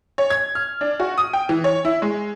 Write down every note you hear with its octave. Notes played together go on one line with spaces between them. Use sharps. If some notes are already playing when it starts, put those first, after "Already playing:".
C#5
G#6
F6
D4
F#4
D#6
G5
E3
C#5
E4
G#3